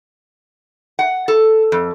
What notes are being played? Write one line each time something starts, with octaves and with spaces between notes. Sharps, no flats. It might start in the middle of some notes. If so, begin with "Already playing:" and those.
F#5
A4
F2